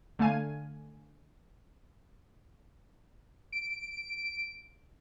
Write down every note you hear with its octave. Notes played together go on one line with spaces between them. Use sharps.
D3 A3 F5 G#5 D#7
D7